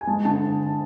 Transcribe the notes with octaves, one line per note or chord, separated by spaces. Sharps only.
G#5
G#3 A5
D3 A5